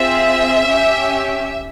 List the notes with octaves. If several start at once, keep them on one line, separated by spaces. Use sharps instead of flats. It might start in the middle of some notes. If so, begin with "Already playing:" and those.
Already playing: C4 F4 G#4 E5
C#4 G4